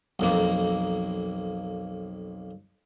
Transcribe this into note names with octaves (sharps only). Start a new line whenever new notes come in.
B1 F2 A#3